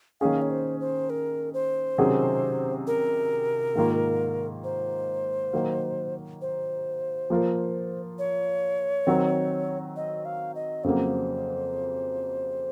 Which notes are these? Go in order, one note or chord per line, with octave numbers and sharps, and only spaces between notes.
D#3 A#3 C#4 G#4 F5
C#5
C5
C5
A#4
C5
C3 D#3 F#3 C#4 G#4
A#4
G#2 D#3 A#3 F4
C5
D#3 F#3 A#3
C5
F3 A#3 F4 A#4
C#5
D#3 F#3 C4
D#5
F5
D#5
F2 C#3 F#3 A#3 C5